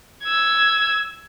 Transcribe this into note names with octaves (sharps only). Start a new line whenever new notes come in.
E6 G#6